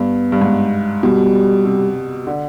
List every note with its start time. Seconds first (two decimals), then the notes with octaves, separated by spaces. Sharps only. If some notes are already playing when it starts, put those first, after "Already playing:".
Already playing: G2 B3
0.32 G2
0.41 G#2
1.03 B2 G3
1.65 C3
2.27 D3